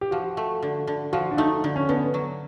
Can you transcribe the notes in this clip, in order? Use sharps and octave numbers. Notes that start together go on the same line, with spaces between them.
G4
F3 F#4
A3
D3
D3
F3 F#4
D4
A3 D#4
D3
C#4
D3 B3
F#3